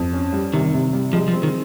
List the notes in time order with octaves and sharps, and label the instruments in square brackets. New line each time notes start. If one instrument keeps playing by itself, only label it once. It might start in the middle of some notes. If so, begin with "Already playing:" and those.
Already playing: [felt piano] F2
C#4
G3
[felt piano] C3 [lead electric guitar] D#3
[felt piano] C3
G3
[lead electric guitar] F3 [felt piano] G#3
[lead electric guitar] F3
[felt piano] C4
[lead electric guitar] D#3